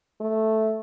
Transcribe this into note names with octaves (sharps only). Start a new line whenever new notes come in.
A3